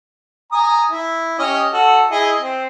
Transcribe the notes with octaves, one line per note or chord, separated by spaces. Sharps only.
G#5 A#5 D#6
E4
C#4 G4 D#5
F#4 A4
E4 G#4 D#5
C4